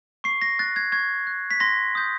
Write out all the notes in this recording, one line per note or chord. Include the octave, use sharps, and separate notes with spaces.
C#6 C7
A#6
F#6 A6
G#6
C#6 G#6
F#6
B6
C6 A#6
D#6 G6